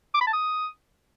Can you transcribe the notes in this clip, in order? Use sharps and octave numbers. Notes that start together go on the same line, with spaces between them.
D6
B5
A5
D#6